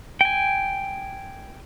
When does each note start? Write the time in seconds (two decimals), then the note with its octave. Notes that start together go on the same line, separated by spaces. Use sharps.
0.21 G5 G#5